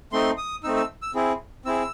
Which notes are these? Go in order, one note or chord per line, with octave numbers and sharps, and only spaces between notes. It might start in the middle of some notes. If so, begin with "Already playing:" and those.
A3 C4 D#4 C6
D#6
A3 C4 D#4 E6
E6
E6
C4 E4 G#4
C4 E4 G#4 E6